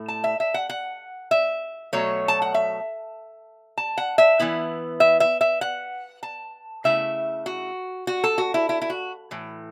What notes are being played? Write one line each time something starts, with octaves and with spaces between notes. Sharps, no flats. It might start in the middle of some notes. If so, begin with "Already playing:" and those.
Already playing: A2 A3
A5
E5
E5
F#5
F#5
E5
B2 F#3 A3 C#5
A5
F#5
E5
A5
F#5
E5
E3 B3 E4
E5
E5
E5
F#5
A5
C#3 A3 E4 E5
F#4
F#4
A4
F#4
E4
E4
E4
F#4
A2 E3